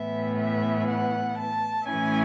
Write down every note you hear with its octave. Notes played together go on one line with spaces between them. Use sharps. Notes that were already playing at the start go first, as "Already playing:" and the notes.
Already playing: A2 E3 B3 E5
E5
F#5
A5
A2 E3 A3 C#4 E4 G#5